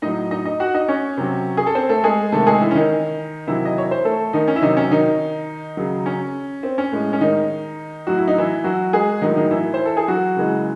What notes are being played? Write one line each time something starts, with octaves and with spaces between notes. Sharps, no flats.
A2 F#3 D#4 D#5
D#4 D#5
D#4 D#5
F#4 F#5
D#4 D#5
C#4 C#5
C3 F#3
G#4
A4
C4 C5
A3 A4
G#3 G#4
C3 D#3 G#3 A3 A4
G#3 G#4
E3 E4
C#4
D#3 D#4
C3 D#3 E3 F#3 E4
D#5
C#5
C5
A3 A4
D#3 D#4
C#4
E4
C3 D#3 F#3 D#4
C#4
D#3 D#4
C#3 F#3
C#4
C4
C#4
A2 G#3
C#4
D#3 D#4
A2 F#3 F#4
E4
D#4
E3 E4
F#3 F#4
G#3 G#4
A2 D#3 F#3 D#4
D#3 D#4
E3 E4
C5
A4
G#4
F#3 F#4
C#3 E3 G#3